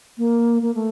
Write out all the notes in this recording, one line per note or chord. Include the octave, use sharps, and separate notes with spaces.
A#3
A#3
A3